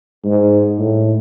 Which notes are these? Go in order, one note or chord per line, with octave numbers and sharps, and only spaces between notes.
G#2
A2